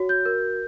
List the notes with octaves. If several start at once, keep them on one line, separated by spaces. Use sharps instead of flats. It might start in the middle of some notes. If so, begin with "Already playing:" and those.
Already playing: F#4 C#5
G6
A#4